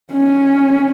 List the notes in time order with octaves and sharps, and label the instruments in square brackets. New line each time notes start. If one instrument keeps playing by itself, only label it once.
[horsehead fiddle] C#4